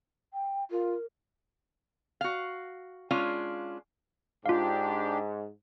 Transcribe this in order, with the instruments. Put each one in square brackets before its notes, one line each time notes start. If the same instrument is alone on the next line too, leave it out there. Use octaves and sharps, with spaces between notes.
[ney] G5
[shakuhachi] F4 [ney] A#4
[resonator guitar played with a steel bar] F#4 F5
G#3 C#4 D4 F4 F5
[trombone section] G#2 [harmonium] D4 G4 [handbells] F4 F5